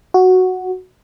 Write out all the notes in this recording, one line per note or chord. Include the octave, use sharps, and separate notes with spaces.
F#4